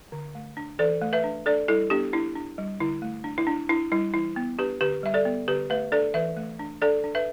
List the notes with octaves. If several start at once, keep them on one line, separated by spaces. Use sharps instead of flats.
D3
A3
D4
E3 A4 D5
A3
B4 E5
D4
D4 A4 D5
G3 E4 A4
B3 D4 G4
D4 E4
D4
G3
D3 E4
A3
D4
E4
D4
D4 E4
G3 E4
E3 E4
B3
D4 G4 B4
D3 G4 B4
G3 E5
A4 D5
B3
D3 G4 B4
A3 B4 E5
D4 A4 D5
E3 B4 E5
A3
D4
D4 A4 D5
D4
B4 E5